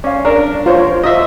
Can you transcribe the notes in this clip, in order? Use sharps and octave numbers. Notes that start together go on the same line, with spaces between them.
C#4 D5 F5
D4 A#4
F4 C5 C#5
F4 C5 D#5 E5